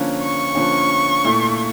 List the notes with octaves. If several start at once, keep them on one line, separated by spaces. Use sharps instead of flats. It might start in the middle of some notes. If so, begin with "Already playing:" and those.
Already playing: D3 F3 A#3 C#4
C#6
D3 F3 A#3 C#4
A#2 A3 E4